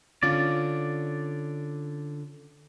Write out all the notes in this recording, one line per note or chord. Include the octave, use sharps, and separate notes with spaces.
D3 C#4 F4 D5